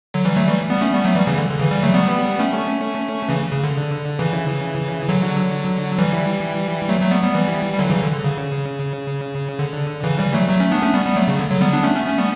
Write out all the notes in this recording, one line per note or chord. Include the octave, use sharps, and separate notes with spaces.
D3 F#3
E3 G3
F#3 A3
E3 G3
G3 B3
A3 C#4
G3 B3
F#3 A3
E3 G3
C#3 E3
D3
D3
C#3 E3
E3 G3
F#3 A3
G3 B3
A3 C#4
C#3 E3
C#3
D3
C#3 E3
D3 F#3
E3 G3
F#3 A3
F#3 A3
G3 B3
G3 B3
E3 G3
G3
D3 F#3
C#3 E3
D3
D3
C#3
D3
C#3 E3
E3 G3
F#3 A3
F#3 A3
A3 C#4
B3 D4
A3 C#4
G3 B3
G3 B3
F#3 A3
C#3
D3
D3 F#3
G3 B3
B3 D4
A3 C#4
A3 C#4
A3 C#4
G3 B3